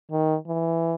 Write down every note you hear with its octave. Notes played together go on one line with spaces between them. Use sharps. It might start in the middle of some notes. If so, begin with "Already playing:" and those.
D#3
E3